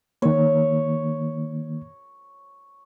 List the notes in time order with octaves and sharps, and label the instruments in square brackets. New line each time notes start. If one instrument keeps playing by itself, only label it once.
[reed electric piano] D#3 A#3 [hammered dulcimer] C#5